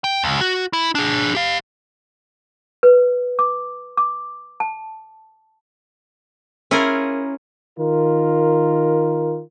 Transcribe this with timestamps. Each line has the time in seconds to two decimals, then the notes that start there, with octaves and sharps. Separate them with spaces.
0.04 G5
0.23 C#2
0.41 F#4
0.73 E4
0.95 D4 G#4
1.35 G4 F5
2.83 B4
3.39 D6
3.97 D6
4.60 A5
6.71 C#4 E4 F4 G#4 A#4
7.78 D#3 F4 A#4